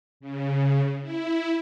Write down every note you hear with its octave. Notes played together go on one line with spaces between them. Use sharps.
C#3
E4